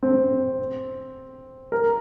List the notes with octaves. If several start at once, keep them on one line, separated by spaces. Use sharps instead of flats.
C4
A#4